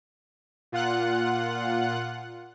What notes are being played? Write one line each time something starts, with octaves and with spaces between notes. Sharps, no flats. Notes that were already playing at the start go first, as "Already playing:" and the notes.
A#2 F4 F#5 F#6